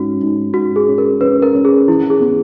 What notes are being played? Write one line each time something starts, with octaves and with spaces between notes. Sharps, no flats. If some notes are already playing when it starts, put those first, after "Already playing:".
Already playing: G#2 C#4 F#4
G#2
G#2 F#4
G#4
C#4
A#4
C#4 B4
A#4
C#4
G#4
E3 E4
G#4
B3